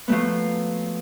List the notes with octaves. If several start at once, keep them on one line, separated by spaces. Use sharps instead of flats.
F3 F#3 A3 B3